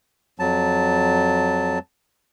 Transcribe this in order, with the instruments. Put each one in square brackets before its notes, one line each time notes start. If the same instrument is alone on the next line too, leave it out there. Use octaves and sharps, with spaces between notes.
[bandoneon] F2 F#3 A5